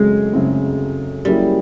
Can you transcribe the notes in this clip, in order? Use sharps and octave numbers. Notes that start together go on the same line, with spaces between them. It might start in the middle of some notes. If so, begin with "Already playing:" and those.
Already playing: F#2 C#3 F#3 G#3 A3 C4
F#2 C#3 F#3 A3 C4
F#3 G3 A#3 C#4 E4 G#4